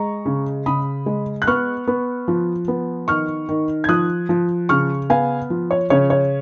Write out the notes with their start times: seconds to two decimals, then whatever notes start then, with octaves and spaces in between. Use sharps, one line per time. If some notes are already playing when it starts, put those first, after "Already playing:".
Already playing: G#3 A#5 C#6
0.26 C#3
0.66 C#3 B5 D#6
1.06 G#3
1.42 F#6
1.47 B3 C#6 F6
1.87 B3
2.28 F3
2.68 B3
3.08 D#3 C#6 F6
3.49 D#3
3.84 G#6
3.89 F3 D#6 F#6
4.29 F3
4.69 C#3 C#6 F6
5.10 B3 F5 G#5
5.50 F3
5.71 C#5
5.90 C#3 C#5
6.10 C#5